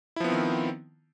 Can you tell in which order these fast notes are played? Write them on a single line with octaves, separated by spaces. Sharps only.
E4 F3 B3 C4 D#3